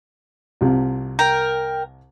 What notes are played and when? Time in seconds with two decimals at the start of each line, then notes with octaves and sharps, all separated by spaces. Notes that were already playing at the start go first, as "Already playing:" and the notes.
0.61 C2 C3 F4
1.19 A#4 G5